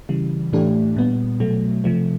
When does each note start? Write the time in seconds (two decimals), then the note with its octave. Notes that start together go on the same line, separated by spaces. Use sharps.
0.09 C#3 E3 G3
0.53 A2 E3 A3 D4 G4
0.97 A#2 G3 B3
1.40 B2 F#3 A3
1.84 C3 F3 A3